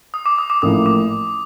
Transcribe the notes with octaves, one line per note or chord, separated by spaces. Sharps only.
D#6
D6
D#6
D6
A1 A2 F3 A#3 D#6
D6